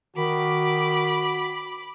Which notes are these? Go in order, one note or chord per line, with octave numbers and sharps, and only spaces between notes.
D#3 F#4 B5 D6